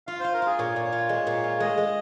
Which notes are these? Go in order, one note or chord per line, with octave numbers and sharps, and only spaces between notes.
F4 F5
F4 C5
A#4
F4 G#4
A#2 C#5
A#2
C#5
F4
G#3
A#2
F4
G#3 D#5
G#3